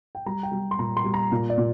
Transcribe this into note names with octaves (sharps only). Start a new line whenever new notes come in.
G5
G3 A#5
G5
G3
C6
A#2 A#5
C6
G3
A#5
A#2
D5
A#2